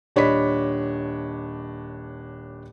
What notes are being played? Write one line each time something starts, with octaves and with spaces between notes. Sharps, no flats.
D#1 D4 C#5 D#5 B5 B6